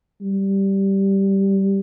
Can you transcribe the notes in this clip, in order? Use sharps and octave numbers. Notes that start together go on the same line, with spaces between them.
G3